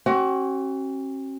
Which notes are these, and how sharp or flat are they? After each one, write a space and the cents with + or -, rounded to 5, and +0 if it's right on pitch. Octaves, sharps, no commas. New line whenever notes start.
C#4 -45 F#4 +35